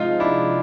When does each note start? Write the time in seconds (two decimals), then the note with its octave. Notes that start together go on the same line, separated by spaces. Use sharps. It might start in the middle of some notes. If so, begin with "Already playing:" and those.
Already playing: C3 F3 G#3 D#4 F4
0.20 D4 E4